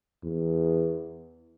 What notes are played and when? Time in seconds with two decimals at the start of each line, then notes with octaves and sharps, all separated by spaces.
0.23 E2